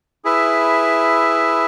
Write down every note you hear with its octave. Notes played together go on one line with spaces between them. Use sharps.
E4 G#4 B4 E5